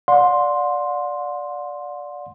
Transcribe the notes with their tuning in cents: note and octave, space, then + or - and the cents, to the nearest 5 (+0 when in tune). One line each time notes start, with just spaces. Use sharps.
D5 -10 F#5 -45 C6 +5